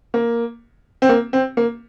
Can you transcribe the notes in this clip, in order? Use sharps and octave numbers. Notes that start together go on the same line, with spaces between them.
A#3
C4
A#3
C4
A#3